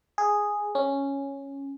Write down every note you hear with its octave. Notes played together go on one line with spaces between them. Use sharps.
G#4
C#4